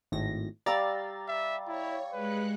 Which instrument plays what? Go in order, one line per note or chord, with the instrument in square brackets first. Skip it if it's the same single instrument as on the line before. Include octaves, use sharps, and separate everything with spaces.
[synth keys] G#1 A2 A#6
[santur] G3 F5 E6 [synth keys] D5 A#5 A6
[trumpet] E5
[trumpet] E4 [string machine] C#5
[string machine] G#3 F#6 C#7 [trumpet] B4